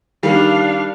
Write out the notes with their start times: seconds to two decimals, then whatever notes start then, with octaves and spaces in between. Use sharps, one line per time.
0.23 D#3 G3 D4 F5